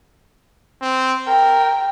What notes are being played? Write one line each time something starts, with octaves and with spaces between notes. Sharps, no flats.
C4
A#4 G5